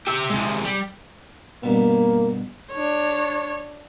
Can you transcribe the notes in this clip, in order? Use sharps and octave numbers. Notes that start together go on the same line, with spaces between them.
G4 E5
C3 G#3
G3
G2 B2 A#3
D4 C#5